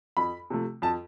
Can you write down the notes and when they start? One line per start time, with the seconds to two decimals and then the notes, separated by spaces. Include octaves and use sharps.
0.17 F2 B5
0.50 C3 F3 A3
0.82 F2 A5